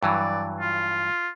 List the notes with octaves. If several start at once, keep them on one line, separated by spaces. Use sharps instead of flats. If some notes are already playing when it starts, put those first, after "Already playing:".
G2 E3 F#3 D5
F4